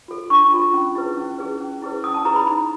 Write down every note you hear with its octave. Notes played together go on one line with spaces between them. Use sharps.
F4 A4
D4 C#6
F4 A4
C#4
E4 G#4 B4
C#4
E4 G#4 B4
C#4
E4 G#4 B4
C#4 D#6
A5
E4 G#4 B4 A#5
B5
D#4 B5